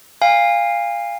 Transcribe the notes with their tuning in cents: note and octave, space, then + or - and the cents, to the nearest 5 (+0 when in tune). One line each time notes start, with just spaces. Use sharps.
F5 +0 G#5 -35